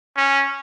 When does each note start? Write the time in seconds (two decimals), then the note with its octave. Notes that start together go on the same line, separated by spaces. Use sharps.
0.17 C#4